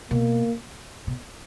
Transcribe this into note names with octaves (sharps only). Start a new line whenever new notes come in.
B2 A#3
B2